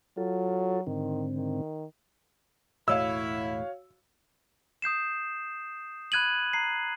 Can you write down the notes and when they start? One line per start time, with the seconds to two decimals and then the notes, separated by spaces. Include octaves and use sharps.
0.17 F#3 F4 A4
0.87 G#2 D3 D#3 C4
1.36 D#3
2.88 E1 A2 A3 E4 F#4 C#5 F5 E6
4.82 D#6 G6 C7 E7
6.12 B5 F#6 G#6 D#7 F#7
6.53 A#5 C7